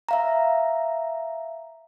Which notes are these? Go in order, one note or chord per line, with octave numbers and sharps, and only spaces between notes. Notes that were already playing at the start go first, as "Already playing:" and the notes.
E5 F5 A#5